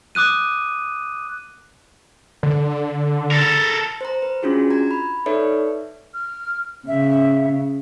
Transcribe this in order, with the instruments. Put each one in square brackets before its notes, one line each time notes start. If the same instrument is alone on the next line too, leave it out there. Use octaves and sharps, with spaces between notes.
[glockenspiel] D6 D#6 F#6 D#7
[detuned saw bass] D3
[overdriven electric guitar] A4 A#4
[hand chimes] C5 A#5
B4
C#4 D4 F4 F#4 G#4
A#5 G#6
B5
D#4 A4 B4 C#5 D5 E5
[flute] F6
[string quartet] C#3 [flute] E5